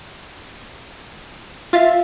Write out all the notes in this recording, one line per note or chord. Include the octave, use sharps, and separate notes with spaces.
F4 E5 F5 A6